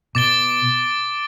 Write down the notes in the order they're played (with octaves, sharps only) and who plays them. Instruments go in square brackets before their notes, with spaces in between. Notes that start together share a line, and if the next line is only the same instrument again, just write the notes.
[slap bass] B2 [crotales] D6 A6 D7 G7